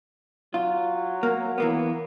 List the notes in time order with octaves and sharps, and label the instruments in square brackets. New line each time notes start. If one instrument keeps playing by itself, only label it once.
[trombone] F#3 [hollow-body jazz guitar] F4
[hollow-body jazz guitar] A#3
E3 A#3 B3